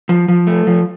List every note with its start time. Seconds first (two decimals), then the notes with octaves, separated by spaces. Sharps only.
0.09 F3
0.28 F3
0.47 A3
0.67 F3